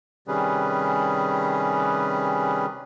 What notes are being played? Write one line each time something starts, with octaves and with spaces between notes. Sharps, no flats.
C3 D#3 G3 C#4 G#4 B4